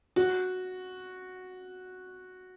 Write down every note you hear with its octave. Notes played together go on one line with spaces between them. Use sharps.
F#4